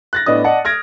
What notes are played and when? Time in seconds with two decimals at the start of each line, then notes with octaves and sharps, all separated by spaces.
0.13 F#6 A6 A#6
0.26 A2 B3 D4 D#5 D#6
0.44 D5 D#5 F#5 A5
0.65 F6 G#6 A#6 D7